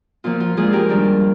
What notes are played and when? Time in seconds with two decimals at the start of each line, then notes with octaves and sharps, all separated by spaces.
0.24 A#2 F3 A#3 F4
0.40 F4
0.57 A#2 F3 G#3 D4 F4 G#4
0.73 G4 A#4
0.89 D#3 G3 D4